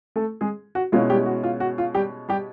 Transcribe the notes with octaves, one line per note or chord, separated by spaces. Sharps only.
A3 A4
G#3 G#4
F#4
B2 G#3 C#4 E4 F4
G3 G4
F#4
F4
F#4
F4
G3 G4
G3 G4